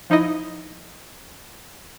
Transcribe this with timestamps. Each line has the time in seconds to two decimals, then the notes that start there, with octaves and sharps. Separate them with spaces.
0.10 F3 D#4 E4 D#5